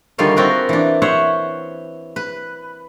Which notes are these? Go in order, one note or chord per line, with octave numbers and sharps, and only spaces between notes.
D3 D#3 G3 F4 G#4 C#5
C4 F4 F#4 A#4 B4
E3 D4
C5 C#5 E5 F#5
B4